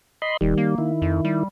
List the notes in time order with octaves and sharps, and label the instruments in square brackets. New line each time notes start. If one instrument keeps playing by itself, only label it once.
[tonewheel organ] D#5 B5 C6
[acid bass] D#1 [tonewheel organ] D#3 G3
[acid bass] A#3
[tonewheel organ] D#3 E4
[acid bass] F2
G3